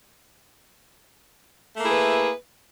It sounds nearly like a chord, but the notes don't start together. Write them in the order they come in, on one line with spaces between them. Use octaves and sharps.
A3 A#3 E4 G#4 B4